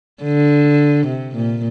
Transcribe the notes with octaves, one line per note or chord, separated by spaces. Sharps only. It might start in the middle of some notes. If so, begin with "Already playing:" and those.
D3
C3
A#2